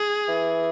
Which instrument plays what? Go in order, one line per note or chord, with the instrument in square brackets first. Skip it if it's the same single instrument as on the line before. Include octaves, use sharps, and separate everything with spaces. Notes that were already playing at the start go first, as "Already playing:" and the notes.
Already playing: [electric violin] G#4
[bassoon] E3